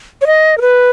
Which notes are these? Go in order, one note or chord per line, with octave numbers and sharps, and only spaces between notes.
C#5
D#5
A#4
B4